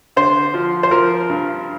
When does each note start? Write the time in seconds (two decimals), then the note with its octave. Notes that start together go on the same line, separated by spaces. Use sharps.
0.16 D3 C5
0.54 F3
0.83 C5
0.91 F3 A#4
1.30 G2